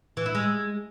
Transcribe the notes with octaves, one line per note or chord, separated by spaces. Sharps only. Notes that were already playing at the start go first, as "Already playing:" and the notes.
E3
E4
G#3